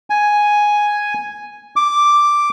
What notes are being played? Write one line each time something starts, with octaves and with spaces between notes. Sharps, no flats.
G#5
D6